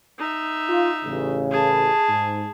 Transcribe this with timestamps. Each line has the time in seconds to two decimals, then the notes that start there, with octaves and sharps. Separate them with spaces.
0.19 D#4 E5
0.68 F4
1.04 A1 C#3
1.51 G#4 A5
2.09 G#2